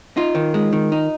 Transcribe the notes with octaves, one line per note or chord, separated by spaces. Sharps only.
D#4 F4
D#3
G#3
D#3
D#4